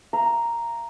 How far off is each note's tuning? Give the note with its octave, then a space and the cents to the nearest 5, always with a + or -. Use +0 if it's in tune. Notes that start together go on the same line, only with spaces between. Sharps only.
F5 -35 A#5 +0